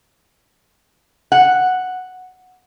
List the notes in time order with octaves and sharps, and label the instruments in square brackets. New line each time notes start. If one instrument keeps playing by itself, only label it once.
[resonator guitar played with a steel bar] F#5